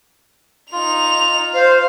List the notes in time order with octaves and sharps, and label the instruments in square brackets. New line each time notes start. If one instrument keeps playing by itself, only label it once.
[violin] D#4 F7 [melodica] F4
[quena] C5 [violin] F5